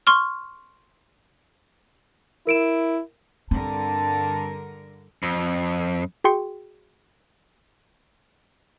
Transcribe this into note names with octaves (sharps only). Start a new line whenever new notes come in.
C6 C#6 F6
E4 A#4 D7 E7
G2 D3 C4 A#4 A5
F2
F#4 G#4 G5 C6 C#7